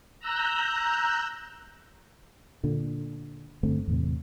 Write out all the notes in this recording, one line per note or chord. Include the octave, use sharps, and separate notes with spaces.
A#5 E6 F#6 G6
A#2 D3
G1 D3 A3 C4
E2 A2 C3